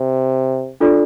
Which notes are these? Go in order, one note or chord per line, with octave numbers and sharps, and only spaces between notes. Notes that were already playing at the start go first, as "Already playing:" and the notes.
Already playing: C3
D4 F4 A4 D5